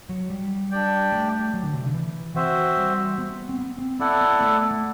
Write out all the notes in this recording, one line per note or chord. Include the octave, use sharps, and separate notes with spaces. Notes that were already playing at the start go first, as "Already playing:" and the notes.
F#3
G3
D4 G4 D5 G5
A3
F#3
D3
C3
D3
E3
E3 C4 F#4 C5 E5
G3
B3
C4
B3
C4
B3 E4 A4 D5 F#5
B3
A3
A3